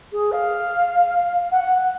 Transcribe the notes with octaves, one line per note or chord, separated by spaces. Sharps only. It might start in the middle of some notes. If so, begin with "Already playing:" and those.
G#4
F5
F#5